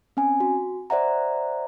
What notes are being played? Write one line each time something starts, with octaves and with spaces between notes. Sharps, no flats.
C4 C#4 G#5
F#4
C5 D5 E5 F#5 A#5